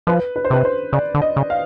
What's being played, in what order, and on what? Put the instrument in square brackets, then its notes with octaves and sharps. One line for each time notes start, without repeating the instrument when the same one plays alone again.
[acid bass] F3 [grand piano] B4
[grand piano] B4
C5
[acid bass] C3 [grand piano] B4
[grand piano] C5
[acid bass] C#3 [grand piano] D5
[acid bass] D3
[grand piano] D#5
[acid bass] C#3
[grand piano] F5